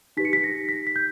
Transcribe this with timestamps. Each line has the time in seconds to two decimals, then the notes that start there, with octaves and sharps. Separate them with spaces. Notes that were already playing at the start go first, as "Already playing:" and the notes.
0.17 D#4 G4 B4 B6
0.25 C#7
0.33 B6
0.44 A#6
0.69 B6
0.87 B6
0.96 G6